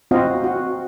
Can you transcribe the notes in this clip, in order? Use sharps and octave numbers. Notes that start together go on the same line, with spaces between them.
C4 F4 F#4 D#5 F5
F#4